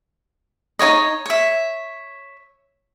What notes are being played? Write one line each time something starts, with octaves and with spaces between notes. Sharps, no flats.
D#4 F#4 C#5 D#5
C#5 E5